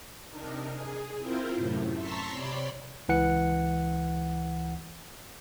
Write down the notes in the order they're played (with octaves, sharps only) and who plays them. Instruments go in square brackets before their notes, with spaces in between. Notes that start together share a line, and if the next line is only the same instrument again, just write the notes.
[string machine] C3 D4 D#4 A#4
G#4
C4 E4 F4 A#4 C5
F#2 A2 C3 A3
A5 A#5 C6 C#6 E6 B6
C3 C#5 D5 B5 C6
[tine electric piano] C#2 E3 F#5 C#7